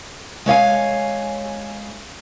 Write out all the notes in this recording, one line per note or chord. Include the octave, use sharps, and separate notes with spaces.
G#3 C#5 F5 G#5